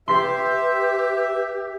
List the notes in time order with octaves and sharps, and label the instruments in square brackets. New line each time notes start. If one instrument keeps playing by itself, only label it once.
[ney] G4 [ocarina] B4 [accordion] E5 [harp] C6 B6 C7